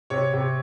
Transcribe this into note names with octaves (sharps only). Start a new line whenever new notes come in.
C3 C#5
C3